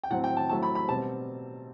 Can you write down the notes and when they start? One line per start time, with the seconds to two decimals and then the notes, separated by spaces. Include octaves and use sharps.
0.04 G5
0.10 A2 F#3 C4 F#5
0.24 G5
0.37 A5
0.49 A2 F#3 A3 C4 A5
0.63 B5
0.75 B5
0.88 B2 G3 C4 A5